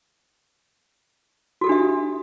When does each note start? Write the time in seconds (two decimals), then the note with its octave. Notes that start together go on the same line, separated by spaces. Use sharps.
1.61 F#4
1.64 A4
1.67 G4
1.69 D4
1.72 E5